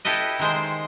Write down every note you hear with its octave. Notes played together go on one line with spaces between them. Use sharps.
E4 G4 A4 B4 D#5
D#3 G#3 C5